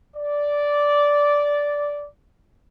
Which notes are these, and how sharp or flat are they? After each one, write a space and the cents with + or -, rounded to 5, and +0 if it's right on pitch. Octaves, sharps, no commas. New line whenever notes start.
D5 -10